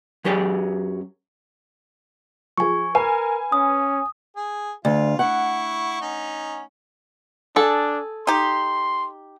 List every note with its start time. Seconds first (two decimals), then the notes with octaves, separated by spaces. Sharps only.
0.25 F#2 F#3 G4 G#4 D5
2.57 F3 G#4 G#5 C#6
2.95 A#4 B4 G#5
3.52 C#4 D#6
4.36 G#4
4.85 D2 F4
5.19 E4 F#5 C#6
6.01 C#4 D#4
7.56 D4 G#4 A4
8.27 D#4 G4 C6